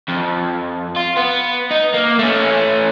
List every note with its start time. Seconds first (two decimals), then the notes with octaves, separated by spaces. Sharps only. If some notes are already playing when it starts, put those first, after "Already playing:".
0.09 F2
0.96 F4
1.17 B3
1.71 D#4
1.94 A#3
2.19 A3 C#4